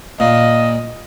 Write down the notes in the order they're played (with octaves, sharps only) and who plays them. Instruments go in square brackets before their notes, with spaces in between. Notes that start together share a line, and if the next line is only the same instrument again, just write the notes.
[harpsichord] A#2 [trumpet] D#5